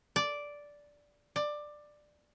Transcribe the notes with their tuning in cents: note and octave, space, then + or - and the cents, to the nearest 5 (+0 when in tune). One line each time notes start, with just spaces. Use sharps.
D5 -5
D5 +15